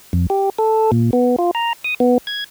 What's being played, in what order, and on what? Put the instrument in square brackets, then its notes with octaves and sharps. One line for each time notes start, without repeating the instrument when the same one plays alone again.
[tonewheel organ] F2
G4
A4
A#2
B3
F4
A#5
D#6
B3
G#6